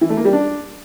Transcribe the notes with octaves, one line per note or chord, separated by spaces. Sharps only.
E3
A3
A#3
G3
D4